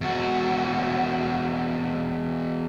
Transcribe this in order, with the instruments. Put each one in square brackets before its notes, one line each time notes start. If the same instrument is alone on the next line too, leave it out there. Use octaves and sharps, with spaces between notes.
[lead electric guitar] E2 F#4